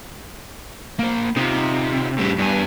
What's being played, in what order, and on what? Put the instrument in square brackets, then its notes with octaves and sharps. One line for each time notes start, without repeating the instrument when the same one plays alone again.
[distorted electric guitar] A#3 C5
[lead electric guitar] C3 [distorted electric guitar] D#4 F4
[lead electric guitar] A2 G3
[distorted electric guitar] E2 G#5 [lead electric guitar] G2